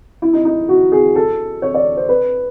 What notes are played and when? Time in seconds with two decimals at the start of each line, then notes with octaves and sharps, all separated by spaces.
0.22 E4
0.33 D#4
0.45 D#4
0.69 F#4
0.92 G#4
1.16 A4
1.62 C#5
1.74 D5
1.97 C5
2.09 B4